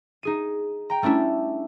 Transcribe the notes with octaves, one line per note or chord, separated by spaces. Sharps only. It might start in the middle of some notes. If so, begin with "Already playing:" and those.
D#4 G#4 D#7
G5 A#5
G3 A3 C#4 D4 E4